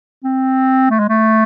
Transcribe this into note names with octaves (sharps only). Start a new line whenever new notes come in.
C4
A3
G#3
A3